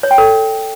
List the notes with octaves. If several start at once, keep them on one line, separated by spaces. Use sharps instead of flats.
C#5
G5
A4